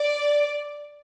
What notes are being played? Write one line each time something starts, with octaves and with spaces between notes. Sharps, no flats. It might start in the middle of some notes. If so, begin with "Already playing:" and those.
Already playing: D5